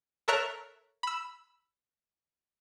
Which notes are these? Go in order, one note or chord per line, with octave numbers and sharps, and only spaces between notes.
A4 A#4 C#5 E5 A#5 F#6
B5 E6